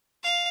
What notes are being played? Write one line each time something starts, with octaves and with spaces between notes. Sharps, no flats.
F5